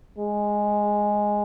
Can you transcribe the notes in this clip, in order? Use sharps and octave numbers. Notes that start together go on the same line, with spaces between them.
G#3